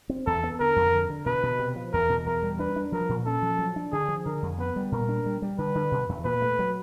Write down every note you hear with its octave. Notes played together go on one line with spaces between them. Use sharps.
C4
E2 A4
B3
D3 A#4
F2
D3
D3
B2 B4
B2
C3
F3
E2 A#4
B2
E2 A#4
G3
D4 B4
D4
F3 A#4
A#2
C#4 A4
F3
F#3
D4
D3 G#4
F3
D3 A#4
F2
B3 B4
G3
A#2 A#4
D4
G3
G3
D3 B4
D3
B2
E2
A#2 B4
A3
F#3